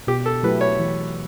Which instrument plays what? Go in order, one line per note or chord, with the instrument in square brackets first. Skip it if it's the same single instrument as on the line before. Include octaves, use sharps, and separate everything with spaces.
[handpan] B2 [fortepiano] G4
[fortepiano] A4
[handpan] F#3 A3 E4 G4 [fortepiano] B4
[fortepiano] C#5
[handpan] E3